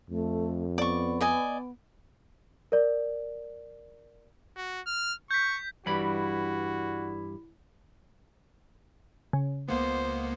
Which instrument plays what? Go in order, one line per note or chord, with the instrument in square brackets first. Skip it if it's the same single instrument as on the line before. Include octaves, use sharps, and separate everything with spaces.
[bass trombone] F2 [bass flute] A3
[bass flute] B3 [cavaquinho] D5 C#6
[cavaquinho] D5 D#5 G#5
[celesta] A#4 D5
[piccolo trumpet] F#4
F6
[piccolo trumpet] C#6 [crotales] G6 B6
[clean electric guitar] G2 B5 [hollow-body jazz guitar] E3 G3 [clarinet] E4 [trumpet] F#4
[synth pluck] C#3
[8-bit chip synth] C#2 A#3 B3 [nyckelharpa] C5